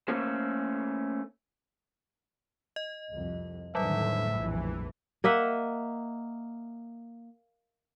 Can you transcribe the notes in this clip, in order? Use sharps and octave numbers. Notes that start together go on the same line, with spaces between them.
A3 A#3 C#4 A4 C5
D#5
C2 F2
E2 A2 D3 D#3 F#3 G3 E5
F1 A#1 F2 E3
A#3 D#5 E5 F#5